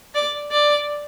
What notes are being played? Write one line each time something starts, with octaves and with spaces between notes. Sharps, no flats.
D5
D5